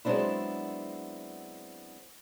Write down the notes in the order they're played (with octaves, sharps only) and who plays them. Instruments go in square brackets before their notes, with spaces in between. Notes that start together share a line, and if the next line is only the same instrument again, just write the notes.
[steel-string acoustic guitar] F#3 G#3 B3 C4 D4 E4